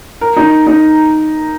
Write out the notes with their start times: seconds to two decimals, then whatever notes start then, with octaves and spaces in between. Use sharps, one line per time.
0.21 A#4
0.36 D#4
0.67 D#4